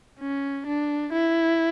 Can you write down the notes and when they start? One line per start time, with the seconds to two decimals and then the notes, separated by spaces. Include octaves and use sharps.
0.20 C#4
0.67 D4
1.13 E4